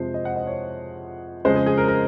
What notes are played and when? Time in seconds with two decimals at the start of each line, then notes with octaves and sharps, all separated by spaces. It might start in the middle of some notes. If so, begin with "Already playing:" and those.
Already playing: F2 C3 F3 G#3 C5
0.14 D#5
0.25 F#5
0.36 D#5
0.47 C#5
1.45 F2 C#3 G#3 C5
1.56 G#4
1.66 G#4
1.78 A#4
1.88 A#4